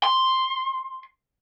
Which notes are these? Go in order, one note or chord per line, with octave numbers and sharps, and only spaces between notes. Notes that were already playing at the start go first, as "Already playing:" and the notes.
C6